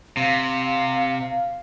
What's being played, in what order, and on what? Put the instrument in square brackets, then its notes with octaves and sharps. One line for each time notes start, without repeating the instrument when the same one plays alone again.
[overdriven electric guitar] C3 [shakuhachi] F5